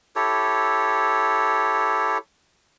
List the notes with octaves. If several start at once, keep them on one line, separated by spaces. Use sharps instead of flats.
E4 G4 A4 C#5